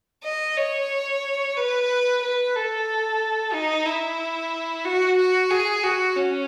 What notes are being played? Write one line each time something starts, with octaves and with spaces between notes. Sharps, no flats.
D#5
C#5
B4
B4
A4
D#4
E4
F#4
F#4
G#4
F#4
C#4